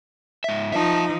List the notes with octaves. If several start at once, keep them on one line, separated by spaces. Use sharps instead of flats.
G#2 E5
F3 D#4 E5 A5